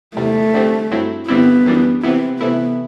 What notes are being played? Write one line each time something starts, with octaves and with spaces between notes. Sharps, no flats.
E2 C3 G3 A3
D3 G3 C4
G2 F#3 C4 E4
G2 D3 G3 B3 C4 E4
F#2 E3 G3 D4
C3 E3 B3 C4 E4
C3 E3 A3 B3 E4